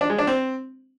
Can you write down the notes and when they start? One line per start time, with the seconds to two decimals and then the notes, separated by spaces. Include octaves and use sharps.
0.01 D4
0.10 G#3
0.19 D4
0.27 C4